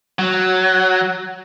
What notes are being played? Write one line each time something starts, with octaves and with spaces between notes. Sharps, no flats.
F#3